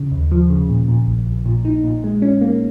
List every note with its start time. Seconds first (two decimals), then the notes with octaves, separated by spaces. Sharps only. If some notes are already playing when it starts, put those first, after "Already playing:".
Already playing: C#3
0.11 D#2
0.31 F3
0.50 C#3
0.69 A#2
0.88 A#2
1.07 A#1
1.26 A#1
1.45 A#2
1.65 D#4
1.84 A#2
2.04 G#3
2.22 C#4
2.41 A#3